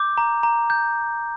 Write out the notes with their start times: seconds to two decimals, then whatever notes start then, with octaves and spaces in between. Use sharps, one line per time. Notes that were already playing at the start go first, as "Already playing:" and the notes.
Already playing: D6 G6
0.18 A#5
0.43 A#5
0.70 G6